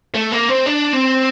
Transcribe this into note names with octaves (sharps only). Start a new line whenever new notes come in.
A3
A#3
C4
D4
C4